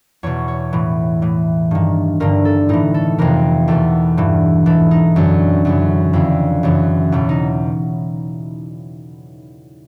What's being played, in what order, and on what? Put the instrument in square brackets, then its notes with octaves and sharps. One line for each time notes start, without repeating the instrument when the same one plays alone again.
[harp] E2 B2 C#5
C#5
A2 E3
A2 E3
G2 D#3
G2 D3 A#4
A4
A2 E3 D#4
A4
F2 C3 E3 A#4
E2 B2 A4
G2 E3
G#2 E3 A4
D#4
F#2 D3
F#2 C#3 E3
F2 D3 E4
F#2 C#3 E3
E2 B2 E4
D#4